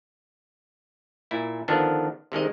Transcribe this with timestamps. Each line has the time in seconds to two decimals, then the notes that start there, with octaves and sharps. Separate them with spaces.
1.31 A#2 E4
1.68 D3 D#3 F3 B3 D4
2.32 C3 D#3 G#3 D#5